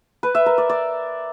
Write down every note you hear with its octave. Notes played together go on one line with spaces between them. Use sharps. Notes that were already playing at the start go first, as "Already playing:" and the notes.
B4
E5
A#4
D5
D5